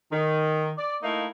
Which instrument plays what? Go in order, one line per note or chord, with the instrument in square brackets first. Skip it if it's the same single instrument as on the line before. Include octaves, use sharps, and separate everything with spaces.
[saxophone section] D#3
D5
A3 A#3 D#4 E4 F5